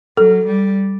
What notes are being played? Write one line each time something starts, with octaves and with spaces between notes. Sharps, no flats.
F#3 A4
G3